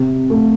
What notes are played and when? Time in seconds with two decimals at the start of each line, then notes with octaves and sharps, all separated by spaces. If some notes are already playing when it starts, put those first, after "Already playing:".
Already playing: C3
0.30 A3